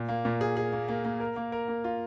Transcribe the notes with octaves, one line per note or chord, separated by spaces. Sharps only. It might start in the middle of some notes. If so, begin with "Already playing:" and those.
Already playing: A#2
A#3
A#2
G#4
G#4
A#3
A#3
A#3
A#4
A#3
A#4
A#3
F4